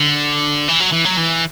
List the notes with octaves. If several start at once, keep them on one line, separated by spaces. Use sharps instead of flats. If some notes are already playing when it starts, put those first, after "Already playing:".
Already playing: D3
E3
F#3
E3
F#3
E3